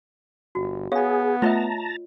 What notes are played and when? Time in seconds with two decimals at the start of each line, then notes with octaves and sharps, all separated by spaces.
0.55 G1 F#4
0.92 B3 G#4 C#5 F5 G#5
1.42 A3 F4 C#5 D#5 E5 A5 A#5